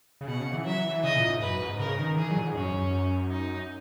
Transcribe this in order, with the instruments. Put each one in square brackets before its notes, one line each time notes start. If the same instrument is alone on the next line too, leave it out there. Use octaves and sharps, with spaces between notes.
[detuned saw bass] C#3
[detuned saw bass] B2 [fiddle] F#5
[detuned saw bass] C#3
E3
[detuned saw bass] F#3 [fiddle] E5
[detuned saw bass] E3
[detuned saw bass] C#3 [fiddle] D#5
[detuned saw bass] A#2
G#2
[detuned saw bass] F#2 [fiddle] B4
[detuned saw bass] G#2
[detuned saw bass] C#3 [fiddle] A#4
[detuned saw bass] D#3
[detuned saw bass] E3 [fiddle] G#4
[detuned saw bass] F#3
A#2
G#2
[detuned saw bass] F#2 [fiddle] C#4
[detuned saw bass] F#2
[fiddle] D#4